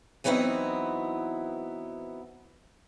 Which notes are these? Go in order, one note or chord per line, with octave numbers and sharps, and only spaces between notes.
E3 F#3 B3 C4 D#4 E4